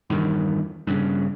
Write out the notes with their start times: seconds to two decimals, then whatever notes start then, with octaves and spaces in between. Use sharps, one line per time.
0.10 E2 G2 D#3
0.87 G2 C#3